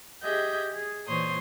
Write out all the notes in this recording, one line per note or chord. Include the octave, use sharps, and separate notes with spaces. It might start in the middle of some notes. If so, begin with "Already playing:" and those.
G4 G#4 D#5 E5 G6
G#4
A#2 E3 C5 C#5 C6 D#6